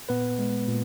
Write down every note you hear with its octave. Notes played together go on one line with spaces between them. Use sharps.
A#2 B3 B4
G#3
A#2